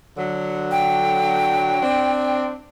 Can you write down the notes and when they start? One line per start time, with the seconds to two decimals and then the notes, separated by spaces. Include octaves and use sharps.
0.17 D3 F#3
0.71 G5
1.82 C4 D4